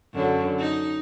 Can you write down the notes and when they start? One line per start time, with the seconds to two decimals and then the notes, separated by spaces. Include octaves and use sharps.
0.14 F#2 D3
0.59 D#4